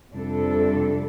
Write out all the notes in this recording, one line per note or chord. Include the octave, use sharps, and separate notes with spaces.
F2 C3 G3 D4 A4